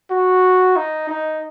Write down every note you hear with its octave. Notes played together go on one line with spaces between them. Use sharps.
F#4
D#4
D#4